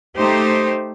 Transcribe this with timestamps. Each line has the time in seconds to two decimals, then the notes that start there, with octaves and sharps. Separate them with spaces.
0.17 A3 D#4 G4 C5